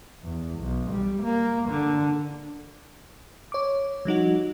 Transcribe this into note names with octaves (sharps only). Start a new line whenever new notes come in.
E2
B1
G3
A#3
D3
C#5 D6
F3 G3 D#4 F#4